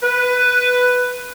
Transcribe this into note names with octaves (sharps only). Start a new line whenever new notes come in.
B4